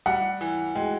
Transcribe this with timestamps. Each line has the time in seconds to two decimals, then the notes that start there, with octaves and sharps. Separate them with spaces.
0.06 G3 F#5
0.41 E3
0.75 G#3 G5